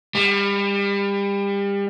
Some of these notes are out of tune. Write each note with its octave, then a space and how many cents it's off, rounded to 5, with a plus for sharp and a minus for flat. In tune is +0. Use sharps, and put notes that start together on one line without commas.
G3 +30